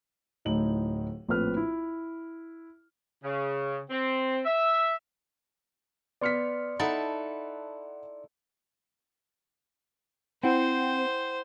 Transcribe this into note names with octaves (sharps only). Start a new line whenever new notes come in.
D1 A2 D#4 F#7
A#1 A2 C4 B4 F6
E4
C#3
C4
E5
B3 D5 C6 F6 B6 C#7
D#4 E4 A4 F#5 A5 B5
C4 E4 C5 F#5 G5